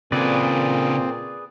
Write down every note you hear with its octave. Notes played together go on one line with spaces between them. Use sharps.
A#2 C#3 C4 G#4 A4 B4 D5